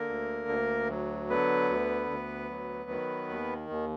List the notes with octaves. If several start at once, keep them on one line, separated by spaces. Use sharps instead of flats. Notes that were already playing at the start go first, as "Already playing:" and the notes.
Already playing: D3 A#3 A#4
D2
D2
F#3
D3 B3 B4
D2
D2
F#3
D#3
D#2
D#2